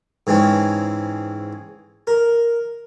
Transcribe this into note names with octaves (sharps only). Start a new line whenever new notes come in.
G#2 E3 G#3 C4 C#4
A#4